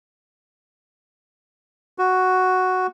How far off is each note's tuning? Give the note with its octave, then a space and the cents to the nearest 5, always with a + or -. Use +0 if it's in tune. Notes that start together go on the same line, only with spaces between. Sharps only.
F#4 +0